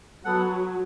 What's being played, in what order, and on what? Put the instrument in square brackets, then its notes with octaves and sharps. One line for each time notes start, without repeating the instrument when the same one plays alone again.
[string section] F#3 [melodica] B3 A4 F#5